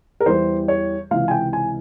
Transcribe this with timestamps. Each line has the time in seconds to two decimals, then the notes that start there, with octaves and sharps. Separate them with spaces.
0.20 A#4
0.26 E2 E3 G3 C5
0.68 C#5
1.11 C#2 C3 E3 F5
1.28 G#5
1.31 G5
1.53 G#5